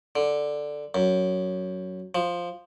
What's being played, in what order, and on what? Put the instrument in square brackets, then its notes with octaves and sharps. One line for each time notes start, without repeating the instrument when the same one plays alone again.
[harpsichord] D3
F#2
F3